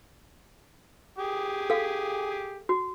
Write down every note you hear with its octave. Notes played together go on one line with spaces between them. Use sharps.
G4 G#4
A4 F5
F#4